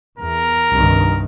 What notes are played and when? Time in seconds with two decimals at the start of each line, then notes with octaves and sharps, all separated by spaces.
0.19 E2 A#4
0.72 C2 G2 D#3